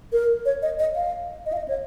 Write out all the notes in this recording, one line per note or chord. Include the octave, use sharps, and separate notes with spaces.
A#4
C#5
D#5
D#5
F5
D#5
F5
D#5
C#5